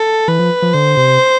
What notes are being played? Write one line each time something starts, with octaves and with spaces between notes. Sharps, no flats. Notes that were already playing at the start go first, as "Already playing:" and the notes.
Already playing: A4
E3 B4
F3
F3
D3 C5
C3